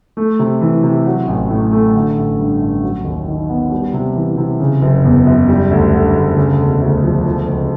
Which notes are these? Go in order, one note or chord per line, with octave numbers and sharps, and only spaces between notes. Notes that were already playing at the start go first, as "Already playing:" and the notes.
A3
C3
E3
C3
F#3
A1
A2
A3
D3
A1
G2
A1
F#3
D#2
D#3
B3
G3
C3
E3
C3
C#3
F#1
E2
F#1
G3
D2
D3
D2
C#3
E1
D2
F3
F3
C#2